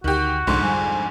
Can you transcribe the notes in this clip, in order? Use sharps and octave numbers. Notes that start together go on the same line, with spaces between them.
D2 D#3 F#4 G4
C2 F2 G#2 D3 C6
G3 G#5